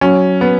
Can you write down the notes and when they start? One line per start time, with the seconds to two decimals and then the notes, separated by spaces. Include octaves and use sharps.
0.01 F#3 C#4
0.41 B3